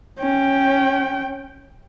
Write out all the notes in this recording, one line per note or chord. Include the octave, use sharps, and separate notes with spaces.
C#4 G5